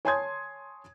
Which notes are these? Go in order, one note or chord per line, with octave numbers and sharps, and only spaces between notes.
C#5 G#5 A5 C6 D#6 G#6